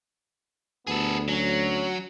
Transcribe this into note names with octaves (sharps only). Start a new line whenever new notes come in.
D2 B3 G#4 A4
F#3 C#4